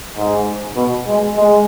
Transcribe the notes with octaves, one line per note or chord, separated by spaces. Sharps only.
G#2
B2
G#3
G#3